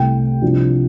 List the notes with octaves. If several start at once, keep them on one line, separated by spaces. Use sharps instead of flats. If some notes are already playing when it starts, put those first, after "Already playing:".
Already playing: C2 C3 A3 G5
C2 C3 F3 D4 F4